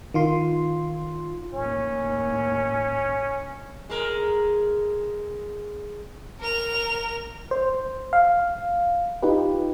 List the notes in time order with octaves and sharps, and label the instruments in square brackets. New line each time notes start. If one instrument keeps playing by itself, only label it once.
[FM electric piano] D#3 F4 C6
[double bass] D#2 A2 [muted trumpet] C#4
[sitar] G#3 A#4
[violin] A#4 F7
[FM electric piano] C5
F5
D#4 F4 G4 B4